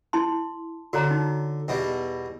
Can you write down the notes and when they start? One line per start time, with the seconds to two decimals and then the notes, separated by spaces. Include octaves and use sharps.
0.13 E4 A5 C6
0.93 D3 F#4 C#5 A#5
1.11 D#4
1.68 E2 B2 G3